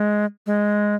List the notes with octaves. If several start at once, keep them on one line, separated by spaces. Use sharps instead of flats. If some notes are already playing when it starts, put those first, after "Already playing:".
Already playing: G#3
G#3